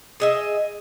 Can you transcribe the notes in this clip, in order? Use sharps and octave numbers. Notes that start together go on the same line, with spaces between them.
G#4 D#5 E5